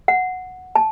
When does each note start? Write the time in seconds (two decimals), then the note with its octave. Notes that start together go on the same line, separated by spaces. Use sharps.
0.08 F#5
0.75 A5